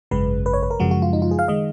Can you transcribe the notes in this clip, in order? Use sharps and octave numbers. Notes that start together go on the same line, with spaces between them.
G#1 F#2 C#3 G#3 B4
B4
C#5
B4
A#4
F#2 C#3 F3 G#3 F#4
F#4
F4
D#4
F4
G#4
F5
D#3 G#3 D#5